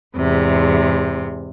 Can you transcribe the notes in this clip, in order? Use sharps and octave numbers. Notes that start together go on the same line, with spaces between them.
E2 G#2 C3